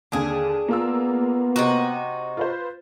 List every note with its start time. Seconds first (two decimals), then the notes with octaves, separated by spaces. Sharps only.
0.12 D#2 D3 D4 G#4
0.69 A#3 B3 F4 E6
1.56 C3 D#4 F#4
2.37 F4 B4 C5